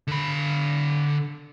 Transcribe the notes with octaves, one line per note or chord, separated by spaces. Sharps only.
D3 B5